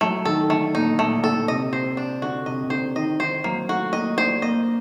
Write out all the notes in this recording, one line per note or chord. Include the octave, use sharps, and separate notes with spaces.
F#3 A3
D#3 A4
D3 A3
A#2 D#4
A#2 A3
D3 A4
C3 D#5
C5
D4
D3 F#4
C3 D#5
C3
D3 C5
D#3 D#5
D#3 C5
F#3 A#3
A3 F#4
A#3 D#5
D4 C5
A#3 D#5